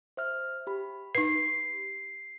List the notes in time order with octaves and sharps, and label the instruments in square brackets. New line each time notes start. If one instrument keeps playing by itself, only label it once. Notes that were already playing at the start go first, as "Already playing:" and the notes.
[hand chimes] C5 E5 F6
G4 B5
[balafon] D#4 B4 [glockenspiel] C7